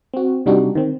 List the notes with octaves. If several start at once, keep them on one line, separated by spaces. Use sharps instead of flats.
C4 F#4
C3 G3 D4 D#4 F#4 G4
D#3 C4